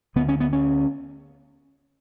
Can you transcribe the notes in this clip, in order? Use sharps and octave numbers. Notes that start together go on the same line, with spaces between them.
D2 D3 B3
C#4
B3
C#4